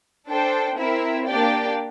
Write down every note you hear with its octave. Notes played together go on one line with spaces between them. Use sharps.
D4 A4 C5 G5
C4 E4 A#4 E5
A#3 D4 G4 D5 G5